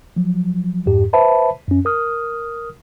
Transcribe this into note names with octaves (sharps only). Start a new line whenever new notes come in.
F3 F#3
F2 G#2 G4
B4 C5 E5 A5 B5
F#2 C#4
A#4 D#6 F6